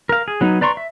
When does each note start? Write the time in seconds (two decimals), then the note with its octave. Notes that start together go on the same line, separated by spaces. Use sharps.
0.09 A#4 F5
0.28 G#4
0.41 F#3 B3 D#4
0.61 B4 D5 A#5 C6 C#6
0.77 E5